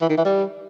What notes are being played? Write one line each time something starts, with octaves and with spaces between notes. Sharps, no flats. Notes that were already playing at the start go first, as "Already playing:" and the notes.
E3
D#3
E3
G3